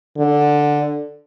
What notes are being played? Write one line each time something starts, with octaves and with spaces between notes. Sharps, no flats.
D3